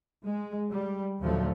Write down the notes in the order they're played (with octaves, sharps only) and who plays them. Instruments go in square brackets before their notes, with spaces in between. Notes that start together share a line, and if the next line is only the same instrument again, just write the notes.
[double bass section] G#3
G3
A#1 D#2 D3 F3 F#3 A3